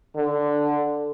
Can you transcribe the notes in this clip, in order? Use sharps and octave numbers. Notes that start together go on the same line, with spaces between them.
D3